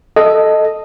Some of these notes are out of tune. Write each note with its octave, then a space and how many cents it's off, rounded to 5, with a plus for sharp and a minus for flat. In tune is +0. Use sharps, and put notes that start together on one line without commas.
A4 +0 D#5 +0